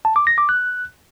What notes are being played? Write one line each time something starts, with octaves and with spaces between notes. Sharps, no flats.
A5
D6
A#6
D6
F#6